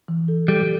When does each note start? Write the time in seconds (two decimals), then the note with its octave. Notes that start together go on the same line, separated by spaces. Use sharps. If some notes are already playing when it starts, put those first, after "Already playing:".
0.08 E3
0.28 A4
0.48 G3 A4